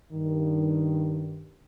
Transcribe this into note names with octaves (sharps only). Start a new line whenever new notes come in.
G2 D#3